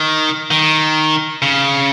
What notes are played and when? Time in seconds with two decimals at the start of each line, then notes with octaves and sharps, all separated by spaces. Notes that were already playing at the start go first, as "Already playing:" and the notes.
Already playing: D#3
0.51 D#3
1.42 C#3